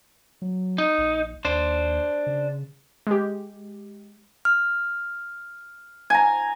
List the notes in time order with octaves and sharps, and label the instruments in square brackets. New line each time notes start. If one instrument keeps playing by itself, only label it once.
[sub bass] F#3
[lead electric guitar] D#4
[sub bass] A#1
[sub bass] D#2 [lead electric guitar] D4 C5
[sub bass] C#3
[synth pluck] G#3 G4
[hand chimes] F6
[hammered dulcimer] G#5 A#5